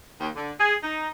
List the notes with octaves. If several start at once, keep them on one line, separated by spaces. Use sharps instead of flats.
D#2
D3
G#4
D#4